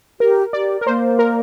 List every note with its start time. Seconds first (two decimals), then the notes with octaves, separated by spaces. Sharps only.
0.20 G4 A#4
0.53 G4 D5
0.81 A#4
0.87 A#3 C5
1.19 A#4